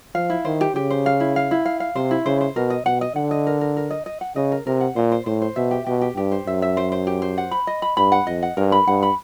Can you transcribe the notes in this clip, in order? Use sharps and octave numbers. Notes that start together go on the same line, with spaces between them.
F3 F5
E4
D#3 C5
G4
C#3 G4
C5
F5
E4
F5
E4
F5
F5
C3 C5
E4
C#3 C5
C5
B2 A#4
D#5
B2 F#5
D#5
D3 F#5
D#5
A#4
A#4
A#4
D#5
D#5
F#5
C#3 D#5
A#4
C3 A#4
F#5
A#2 C5
C5
A2 C5
C5
B2 E5
G4
B2 G4
G4
G2 G4
C5
F#2 E5
E5
C5
C5
G4
C5
F#5
B5
D#5
B5
G2 B5
F#5
F2 D#5
F#5
G2 A#4
B5
G2 F#5
B5